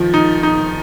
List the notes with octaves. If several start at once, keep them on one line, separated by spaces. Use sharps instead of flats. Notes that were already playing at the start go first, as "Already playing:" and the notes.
Already playing: D#3 F3
D#4
D#4